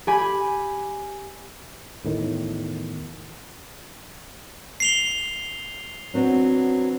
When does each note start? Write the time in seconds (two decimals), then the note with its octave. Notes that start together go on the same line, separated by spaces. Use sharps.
0.07 G4 G#5 B5
2.05 E2 A2 D#3
4.80 C7 F7 G7
6.14 F#3 B3 C4 D4